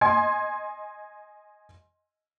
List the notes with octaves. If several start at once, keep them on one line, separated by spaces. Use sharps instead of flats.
D#5 G#5 C6 G#6